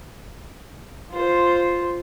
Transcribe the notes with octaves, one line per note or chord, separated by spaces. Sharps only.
F4 C5